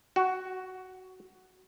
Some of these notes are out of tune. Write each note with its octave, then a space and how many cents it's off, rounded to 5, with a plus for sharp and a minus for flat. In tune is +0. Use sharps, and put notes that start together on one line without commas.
F#4 +10